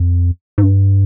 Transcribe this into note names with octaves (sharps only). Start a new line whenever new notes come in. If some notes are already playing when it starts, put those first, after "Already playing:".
Already playing: F2
G#2
G2